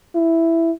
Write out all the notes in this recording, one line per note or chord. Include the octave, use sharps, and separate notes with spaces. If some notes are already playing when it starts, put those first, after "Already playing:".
E4